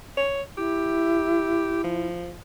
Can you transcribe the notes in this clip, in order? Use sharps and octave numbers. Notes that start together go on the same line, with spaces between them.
C#5
E4 G4
F3